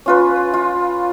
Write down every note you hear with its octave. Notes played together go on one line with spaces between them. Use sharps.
C#4 F4 B4
F4